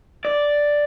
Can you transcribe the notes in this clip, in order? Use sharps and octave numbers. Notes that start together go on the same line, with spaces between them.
D5